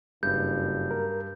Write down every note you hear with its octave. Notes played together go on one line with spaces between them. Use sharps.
F#1 G2 G6
A#4